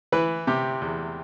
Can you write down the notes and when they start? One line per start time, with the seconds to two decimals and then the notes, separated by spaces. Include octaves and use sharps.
0.12 E3 B4
0.47 C3 G4
0.81 E2